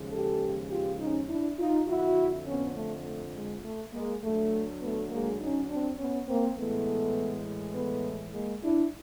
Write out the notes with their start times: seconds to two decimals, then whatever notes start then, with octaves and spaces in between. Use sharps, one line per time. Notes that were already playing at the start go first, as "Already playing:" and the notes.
Already playing: D#2 C#3 F3 G#3
0.12 G4 A4
0.71 F4 G4
1.00 C#4 D#4
1.29 D4 E4
1.59 D#4 F4
1.88 F2 D3 F3 E4 F#4
2.47 B3 C#4
2.76 A3
3.06 A3
3.35 G#3
3.65 A3
3.93 G#3 A#3
4.23 D2 D3 F#3 A3
4.81 A3 B3
5.11 G#3 A#3
5.40 C#4 D#4
5.69 C4 D4
5.99 B3 C#4
6.28 A#3 C4
6.58 A2 E3 G#3 A3 B3
7.75 A3 B3
8.34 G#3 A#3
8.63 D4 E4